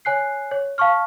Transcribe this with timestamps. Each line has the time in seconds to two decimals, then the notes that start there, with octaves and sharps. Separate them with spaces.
0.05 C#5 G#5 F#6 C7
0.51 C#5
0.78 F5 A5 C#6 F6